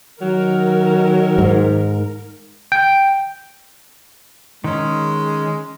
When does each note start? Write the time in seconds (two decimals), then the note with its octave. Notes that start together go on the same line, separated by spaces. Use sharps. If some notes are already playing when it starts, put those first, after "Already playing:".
0.21 D#3 F#3 A#4
1.38 G#2
2.72 G5
4.64 D#3 G#3 C#4